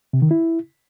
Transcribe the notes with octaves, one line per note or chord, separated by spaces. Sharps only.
C3
D#3
E4